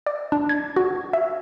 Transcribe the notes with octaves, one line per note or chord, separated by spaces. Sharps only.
D5
D4
G#6
F#4
E5